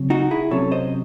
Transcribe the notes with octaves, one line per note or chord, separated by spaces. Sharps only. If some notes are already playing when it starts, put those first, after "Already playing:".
Already playing: C#3 F#3 C4
D#4 F#4
E4 G#4
C3 F#3 C#4 A4 C#5
C5 D#5